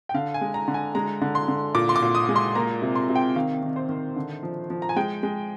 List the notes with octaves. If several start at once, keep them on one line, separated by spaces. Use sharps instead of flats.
G5
D3 F5
G#5
G#3
A#5
D3
G#5
G#3 A#5
D3
C6
D3
A#2 D6
C6
D6
A#2
D#6
G#3
C6
A#3 A#5
C3
C6
C3
G5
D#3 F5
D#3
C5
D#3
D3
F3
F3
A#5
G#5
G#3 G5
G#3